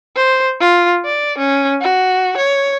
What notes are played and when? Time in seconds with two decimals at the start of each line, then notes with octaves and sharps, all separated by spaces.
0.16 C5
0.60 F4
1.05 D5
1.38 C#4
1.81 F#4
2.37 C#5